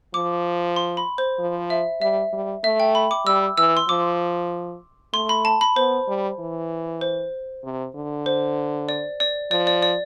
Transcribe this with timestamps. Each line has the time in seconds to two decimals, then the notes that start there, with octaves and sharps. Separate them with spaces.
0.14 F3 D6
0.76 C6
0.97 B5
1.18 C5
1.39 F3
1.70 E5
2.01 G3 E5
2.33 G3
2.64 A3 E5
2.80 G5
2.95 B5
3.11 D6
3.26 G3 E6
3.57 E3 E6
3.77 C6
3.89 F3 D6
5.13 A3 C6
5.29 B5
5.45 A5
5.61 B5
5.76 B3 C5
6.08 G3
6.39 E3
7.01 C5
7.64 C3
7.95 D3
8.26 C5
8.89 D5
9.20 D5
9.51 F3 D5
9.67 D5
9.83 D5